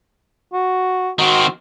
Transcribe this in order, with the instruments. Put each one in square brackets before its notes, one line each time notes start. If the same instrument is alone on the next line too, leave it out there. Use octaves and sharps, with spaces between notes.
[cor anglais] F#4
[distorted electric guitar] D#3 C4 [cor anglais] F#4